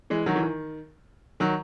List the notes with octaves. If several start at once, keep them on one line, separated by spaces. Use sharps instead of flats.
E3 G#3
D#3 F#3
E3
D#3
D#3 F#3